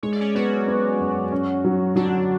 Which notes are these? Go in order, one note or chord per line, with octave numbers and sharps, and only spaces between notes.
G#3 C#5
D5
C#4 C#5
F#3 B3 F#4
B3
F#2
C#4
F#3
D3 F#3 D4